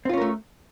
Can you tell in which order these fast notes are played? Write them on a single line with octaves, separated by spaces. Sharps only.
C4 F4 C#4 A#4 A3